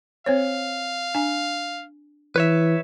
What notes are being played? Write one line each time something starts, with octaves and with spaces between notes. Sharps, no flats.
C4 C5 C#5 F5
D4 G#5
E3 B4 C#5 E5